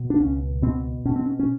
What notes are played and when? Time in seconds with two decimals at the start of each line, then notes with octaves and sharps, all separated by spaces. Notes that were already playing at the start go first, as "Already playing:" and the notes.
Already playing: B2
0.10 D4
0.20 C#2 C#4
0.62 B2 C4
1.05 B2 C#4
1.16 C4
1.26 C#4
1.39 C#4